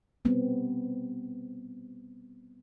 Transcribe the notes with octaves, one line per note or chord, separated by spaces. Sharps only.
G3 B3 C4